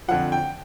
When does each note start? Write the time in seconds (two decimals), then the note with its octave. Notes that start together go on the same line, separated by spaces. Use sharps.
0.08 F2 D3 F3 F#5
0.32 G5